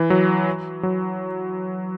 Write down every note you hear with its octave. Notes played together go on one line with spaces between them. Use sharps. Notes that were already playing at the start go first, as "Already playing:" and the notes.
Already playing: E3
F#3
F#3